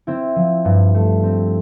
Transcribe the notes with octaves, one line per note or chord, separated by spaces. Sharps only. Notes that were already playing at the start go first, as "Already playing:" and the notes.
C4 E4
F3
G2
A3
C4